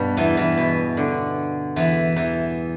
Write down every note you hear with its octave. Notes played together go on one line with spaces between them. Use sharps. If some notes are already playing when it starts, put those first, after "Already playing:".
Already playing: G2 B2 G3 B3
E2 E3
E2 E3
B2
D3
E2 E3
E2 E3